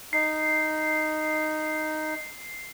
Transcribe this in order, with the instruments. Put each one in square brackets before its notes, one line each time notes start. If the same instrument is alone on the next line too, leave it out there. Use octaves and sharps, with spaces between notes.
[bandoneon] D#4 [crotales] C7